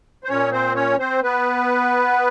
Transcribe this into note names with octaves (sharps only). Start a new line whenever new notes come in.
C5
A#2 C#4 C#5
C4 C5
C#4 C#5
C4 C5
B3 B4